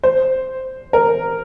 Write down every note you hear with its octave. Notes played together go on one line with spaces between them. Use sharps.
C5
A#4